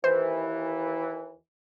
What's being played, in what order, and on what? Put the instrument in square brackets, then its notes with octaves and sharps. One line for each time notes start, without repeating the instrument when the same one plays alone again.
[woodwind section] D#2 E3 [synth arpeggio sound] C5